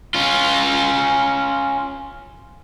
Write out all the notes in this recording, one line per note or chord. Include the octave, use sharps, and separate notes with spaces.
C#4 F4